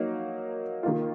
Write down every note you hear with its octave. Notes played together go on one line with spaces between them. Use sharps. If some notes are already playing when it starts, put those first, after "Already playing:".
Already playing: F#3 A#3 D#4
D#3 A#3 F4